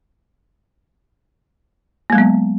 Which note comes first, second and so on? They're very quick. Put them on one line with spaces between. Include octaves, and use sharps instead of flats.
A#3 G#3 F#3 B3